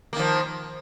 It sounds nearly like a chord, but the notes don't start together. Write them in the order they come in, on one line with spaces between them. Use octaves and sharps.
A#3 D#3 F3